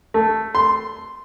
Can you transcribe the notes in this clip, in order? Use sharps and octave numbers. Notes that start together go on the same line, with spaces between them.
A3
C6